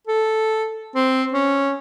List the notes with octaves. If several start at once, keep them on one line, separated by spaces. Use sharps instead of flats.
A4
C4
C#4